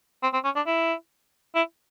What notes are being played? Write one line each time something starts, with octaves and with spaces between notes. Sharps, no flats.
C4
C4
C#4
D4
E4
E4